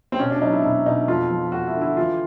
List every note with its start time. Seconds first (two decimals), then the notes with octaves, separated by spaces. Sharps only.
0.12 C4
0.19 B2 C#4
0.30 D4
0.41 F#3 D#4
0.53 E4
0.64 B2 E4
0.86 B2 D#4
1.08 F2 F4
1.31 F3
1.52 F2 F#4
1.67 E4
1.75 D3
1.81 E4
1.97 E3 F4